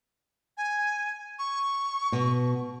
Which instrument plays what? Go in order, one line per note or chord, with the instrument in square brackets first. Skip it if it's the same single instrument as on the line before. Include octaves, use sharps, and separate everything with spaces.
[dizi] G#5
C#6
[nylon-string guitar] B2